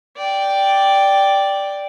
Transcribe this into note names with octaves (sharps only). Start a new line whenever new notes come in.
D5 G5